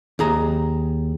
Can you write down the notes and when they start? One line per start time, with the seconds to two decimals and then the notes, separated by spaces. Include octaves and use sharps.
0.19 D#2 G#4 A#5